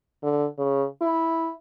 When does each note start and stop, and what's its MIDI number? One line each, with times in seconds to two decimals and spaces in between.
0.23 0.46 50
0.58 0.86 49
1.01 1.52 64